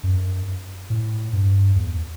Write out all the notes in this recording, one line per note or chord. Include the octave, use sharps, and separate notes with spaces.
F#2
A2
G2
E2